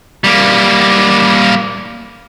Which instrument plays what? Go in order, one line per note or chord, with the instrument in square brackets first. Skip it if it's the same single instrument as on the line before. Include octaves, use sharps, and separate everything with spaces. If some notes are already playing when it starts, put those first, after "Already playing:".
[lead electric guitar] G3 A#3